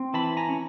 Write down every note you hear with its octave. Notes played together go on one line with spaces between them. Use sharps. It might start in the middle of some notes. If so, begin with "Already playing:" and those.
Already playing: C4
E3 A5 B5
G#5 A#5
C#4